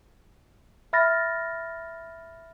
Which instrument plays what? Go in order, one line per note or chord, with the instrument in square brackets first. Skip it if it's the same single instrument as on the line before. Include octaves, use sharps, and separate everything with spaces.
[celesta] E5 B5 F6 A6 A#6